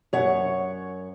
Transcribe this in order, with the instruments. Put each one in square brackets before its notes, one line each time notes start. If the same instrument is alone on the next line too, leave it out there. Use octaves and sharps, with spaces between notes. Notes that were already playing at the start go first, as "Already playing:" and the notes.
[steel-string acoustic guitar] F#2 C#5 F#5